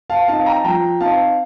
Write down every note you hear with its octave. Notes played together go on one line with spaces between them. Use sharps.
F5 A5
C4 D#4 F5 A5
G5 A#5
A5
F3 G5 A#5
C4 D#4 F5 A5